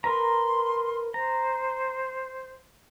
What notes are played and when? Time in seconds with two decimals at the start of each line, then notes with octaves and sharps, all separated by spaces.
0.04 A#4 B4 A#5 C6
1.14 C5 A#5